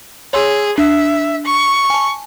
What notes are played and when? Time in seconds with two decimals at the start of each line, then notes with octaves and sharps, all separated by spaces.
0.33 G#4 C#5 C6 E6
0.78 D4 E5
1.45 C#6
1.90 G#5 A5